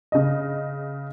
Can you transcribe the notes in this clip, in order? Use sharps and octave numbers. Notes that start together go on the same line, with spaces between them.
C#3 D#5